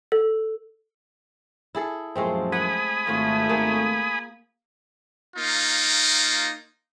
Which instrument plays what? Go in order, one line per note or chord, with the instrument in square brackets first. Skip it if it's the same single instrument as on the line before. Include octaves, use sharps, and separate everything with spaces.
[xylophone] A4
[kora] E4 G#4 A4
[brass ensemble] F#2 A#2 F3 [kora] G#3 A3 C4
[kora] F#5 [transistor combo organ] G#5 B5 D#6
[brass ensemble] G#1 A3 [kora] F4 F#4
[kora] A#3 G#4
[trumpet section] A#3 D#4 F4